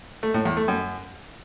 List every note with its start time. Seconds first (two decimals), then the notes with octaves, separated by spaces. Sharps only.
0.23 A3
0.34 A2
0.46 E2
0.57 A3
0.68 F#2